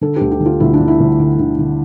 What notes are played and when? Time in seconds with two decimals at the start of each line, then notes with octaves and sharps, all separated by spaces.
0.01 D3 A4
0.16 D2 G4
0.31 G4
0.40 D3
0.46 F4
0.60 D2 E4
0.73 D4
0.80 D3
0.88 E4
1.00 D2
1.19 D3
1.39 D3
1.59 D3